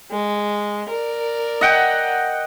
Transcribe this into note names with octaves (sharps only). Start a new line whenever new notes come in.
G#3
A#4 D5
D#5 F#5 G5